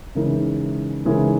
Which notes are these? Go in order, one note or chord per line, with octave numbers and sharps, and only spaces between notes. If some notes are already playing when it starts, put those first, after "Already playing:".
C#3 E3 G#3 D#4 A#4
C#3 E3 G#3 D#4 A#4